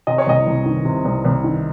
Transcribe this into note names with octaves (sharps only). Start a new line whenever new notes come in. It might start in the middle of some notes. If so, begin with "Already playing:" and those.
C3 D#5
C#5
C2 D#5
C2
D#3
C3
C2
C2
D#3